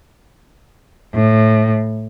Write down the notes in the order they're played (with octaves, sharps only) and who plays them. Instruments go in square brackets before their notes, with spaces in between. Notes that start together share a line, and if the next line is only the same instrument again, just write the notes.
[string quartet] A2